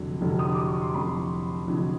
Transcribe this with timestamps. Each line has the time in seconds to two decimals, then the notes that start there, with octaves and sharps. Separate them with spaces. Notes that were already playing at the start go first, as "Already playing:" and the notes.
Already playing: F1 F2 D3 F#3
0.21 F1 F2 D3 F#3
0.39 D#6
0.53 D6
0.67 C#6
0.81 C6
0.94 F1 F2 D3 F#3 B5
1.68 F1 F2 D3 F#3